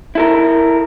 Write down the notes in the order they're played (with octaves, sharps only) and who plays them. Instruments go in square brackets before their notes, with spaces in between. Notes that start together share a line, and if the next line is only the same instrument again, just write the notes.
[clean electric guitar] E4 A4 A#4